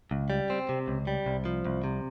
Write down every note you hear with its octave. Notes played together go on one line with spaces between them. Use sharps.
C#2
G3
C4
C3
C#2
G3
C2
F3
C2
C3